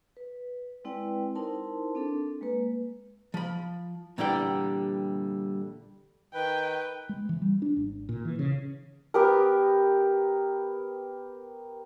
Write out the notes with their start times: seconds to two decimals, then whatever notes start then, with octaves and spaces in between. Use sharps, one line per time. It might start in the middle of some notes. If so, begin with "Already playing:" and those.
0.17 B4
0.85 G#3 C4 E4 B4 D5 G5
1.35 D#4 E4 A#4 C5 A5 C6
1.95 C4 D4 A4
2.41 G#3 A#3 B4
3.34 F3 B5
4.18 A#2 D3 E3 G3 G4 G5
6.34 D#3 B4 G5
7.09 G#3
7.29 E3
7.42 G3
7.62 D4
7.77 G#1
8.09 A#2
8.25 E3
8.39 C#3
9.14 B3 G4 A#4